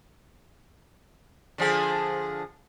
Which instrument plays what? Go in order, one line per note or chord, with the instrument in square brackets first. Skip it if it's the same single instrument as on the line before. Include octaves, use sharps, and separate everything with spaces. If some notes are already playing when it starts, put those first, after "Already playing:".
[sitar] D3 F3 G#4